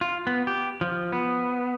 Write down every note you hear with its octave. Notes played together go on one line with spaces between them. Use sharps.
F4
B3
G4
F3
B3